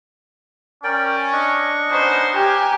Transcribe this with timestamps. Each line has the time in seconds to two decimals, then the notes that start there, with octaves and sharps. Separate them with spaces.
0.84 C#4 A#4 D5 G5
1.32 D4 D#5 C#6
1.90 B3 C#4 D#4 C5
2.35 G4 A#4 G5 G#5